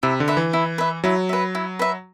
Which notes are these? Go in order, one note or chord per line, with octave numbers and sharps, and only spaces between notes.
C3 E4
D3
B4 E5
E3
E4
B4 E5
F#3 E4
B4 E5
E4
B4 E5